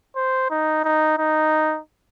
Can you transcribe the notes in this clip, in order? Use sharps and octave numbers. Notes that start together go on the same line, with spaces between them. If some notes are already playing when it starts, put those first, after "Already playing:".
C5
D#4
D#4
D#4